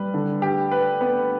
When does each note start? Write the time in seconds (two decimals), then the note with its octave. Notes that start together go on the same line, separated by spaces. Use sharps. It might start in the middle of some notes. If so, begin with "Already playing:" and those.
Already playing: G3 B4
0.14 D3
0.42 G4
0.71 B4
1.01 B3